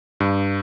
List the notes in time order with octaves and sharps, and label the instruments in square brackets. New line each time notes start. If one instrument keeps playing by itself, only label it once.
[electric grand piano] G2